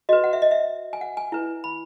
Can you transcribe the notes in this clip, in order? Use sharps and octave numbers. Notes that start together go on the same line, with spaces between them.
F#4 B4 D#5
F#5
E5
D#5
E5
G#5
F#5
G#5
E4 B4
B5